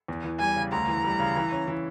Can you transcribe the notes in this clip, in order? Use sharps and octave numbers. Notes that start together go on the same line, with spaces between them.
E2
E3
G3 G#5
C#3
D2 A#5
E3
G3
C#3
E3
C#4
E3